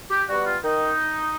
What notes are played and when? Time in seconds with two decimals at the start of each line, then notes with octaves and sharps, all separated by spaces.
0.11 G4
0.28 G3 B3 F#4
0.45 F4
0.63 D#3 D#4